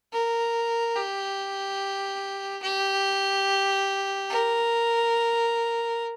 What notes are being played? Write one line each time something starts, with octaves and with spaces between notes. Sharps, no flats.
A#4
G4
G4
A#4